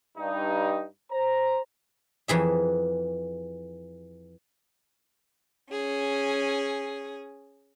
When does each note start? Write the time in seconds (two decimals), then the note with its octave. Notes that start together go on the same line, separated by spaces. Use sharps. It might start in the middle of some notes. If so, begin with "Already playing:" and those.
0.18 G2 D#4
1.12 C5 A#5
2.28 F2 E3 G#4 E5
5.72 C#4 G#4